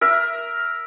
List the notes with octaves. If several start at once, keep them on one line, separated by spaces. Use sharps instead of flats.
A#4 E5